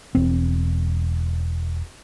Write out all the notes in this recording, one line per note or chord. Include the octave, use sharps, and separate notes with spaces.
E1 C4